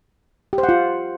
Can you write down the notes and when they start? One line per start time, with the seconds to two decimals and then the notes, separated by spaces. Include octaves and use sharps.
0.53 G4
0.58 C5
0.63 F#5
0.69 F4